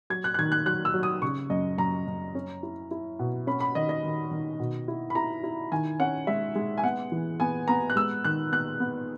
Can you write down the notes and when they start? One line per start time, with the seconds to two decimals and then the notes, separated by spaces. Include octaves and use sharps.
0.10 F#3 G#6
0.24 F#6
0.34 F#6
0.39 D#3 G#6
0.52 F#6
0.66 F#3 F#6
0.85 E6
0.94 F#3
1.03 D#6
1.22 C#3 C#6
1.50 F#2 D#5
1.78 F#2 A#5
2.07 F#2
2.35 C#4
2.63 E4
2.91 E4
3.19 B2
3.47 C#4 B5
3.60 B5
3.75 D#3 D#5
3.89 D#5
4.04 D#3
4.31 D#3
4.60 B2
4.88 E4
5.10 B5
5.15 E4 A#5
5.44 E4
5.72 D#3 G#5
6.00 C#4 F#5
6.27 G#3 E5
6.55 G#3
6.78 G#5
6.84 B3 F#5
7.12 E3
7.40 B3 G#5
7.68 B3 A#5
7.90 F#6
7.96 G#3 E6
8.24 D#3 F#6
8.52 B3 F#6
8.80 B3